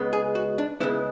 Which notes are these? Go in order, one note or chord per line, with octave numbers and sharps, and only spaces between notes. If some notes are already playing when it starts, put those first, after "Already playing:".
Already playing: C#2 C#3 G#3 B3
G#4
F#4
D4
C#2 C#3 G#3 B3 E4